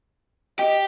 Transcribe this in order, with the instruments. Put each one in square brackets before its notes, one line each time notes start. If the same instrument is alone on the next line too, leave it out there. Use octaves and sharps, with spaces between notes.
[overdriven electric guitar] G4 [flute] D#5